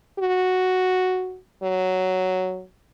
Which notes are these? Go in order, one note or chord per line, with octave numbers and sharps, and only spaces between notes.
F#4
F#3